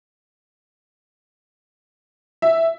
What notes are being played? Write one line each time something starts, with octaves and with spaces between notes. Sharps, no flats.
E5